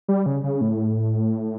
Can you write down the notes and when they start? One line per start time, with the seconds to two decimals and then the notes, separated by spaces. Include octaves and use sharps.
0.08 G3
0.26 C#3
0.44 C#3
0.61 A2